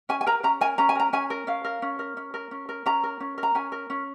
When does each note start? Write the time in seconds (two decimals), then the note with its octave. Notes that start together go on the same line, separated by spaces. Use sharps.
0.09 C#4 G#5
0.21 G#5
0.27 A#4 A#5
0.43 C#4 A#5
0.61 A#4 G#5
0.78 C#4 A#5
0.89 G#5
0.95 A#4 A#5
1.13 C#4 G#5
1.30 A#4
1.47 C#4 F5
1.65 A#4
1.82 C#4
1.99 A#4
2.17 C#4
2.34 A#4
2.51 C#4
2.69 A#4
2.86 C#4 A#5
3.04 A#4
3.20 C#4
3.38 A#4
3.43 A#5
3.55 C#4 G#5
3.72 A#4
3.90 C#4